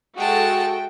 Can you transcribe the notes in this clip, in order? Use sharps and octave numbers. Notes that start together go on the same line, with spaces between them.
G#3 F#4 A4 E5 G5 A5